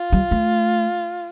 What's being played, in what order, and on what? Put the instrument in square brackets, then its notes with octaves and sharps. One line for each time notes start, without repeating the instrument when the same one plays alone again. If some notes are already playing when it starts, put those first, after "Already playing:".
Already playing: [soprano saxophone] F4
[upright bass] G3
A3